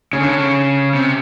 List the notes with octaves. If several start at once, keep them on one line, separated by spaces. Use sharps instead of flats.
C#3 C#4
D3
C#3
C3